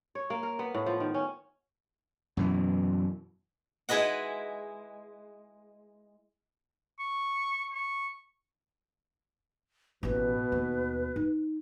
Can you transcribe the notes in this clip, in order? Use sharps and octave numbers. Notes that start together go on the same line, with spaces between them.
C#5
A#3
A#4
B3
A2
F3
D#3
C#4
F#2 B2 E3
G#3 E4 G#4 B4 D#5 F#5
C#6
C#6
A1 B2 B3 B4
D#2
D#4